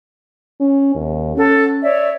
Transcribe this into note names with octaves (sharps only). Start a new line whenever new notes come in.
C#4
D#2
C#4 A4 F#5
C#5 D5 E5